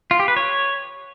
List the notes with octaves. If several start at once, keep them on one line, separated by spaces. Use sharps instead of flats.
F4
G4
B4
C#5